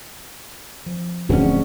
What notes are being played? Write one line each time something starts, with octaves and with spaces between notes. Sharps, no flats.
F3
D1 F2 C#4 D4 F#4 G#4